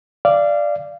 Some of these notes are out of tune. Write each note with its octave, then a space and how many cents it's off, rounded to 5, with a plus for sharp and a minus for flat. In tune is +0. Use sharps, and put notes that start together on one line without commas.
D5 +0 F5 -25